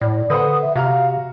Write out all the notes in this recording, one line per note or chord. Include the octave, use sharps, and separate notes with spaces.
A2 D5
D3 B4 C5 F#5 D#6
E5
C3 F#4 F5 A#5 F6